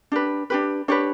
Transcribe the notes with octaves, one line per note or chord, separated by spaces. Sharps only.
D4 G4 B4
D4 G4 B4
D4 G4 B4 C#5